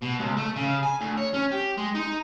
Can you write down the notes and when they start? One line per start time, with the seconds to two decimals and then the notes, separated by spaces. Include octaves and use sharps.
0.02 B2
0.19 C#2
0.37 A3
0.56 C#3
0.83 G#5
1.01 D2
1.18 C#5
1.34 C#4
1.52 G4
1.78 G#3
1.95 D#4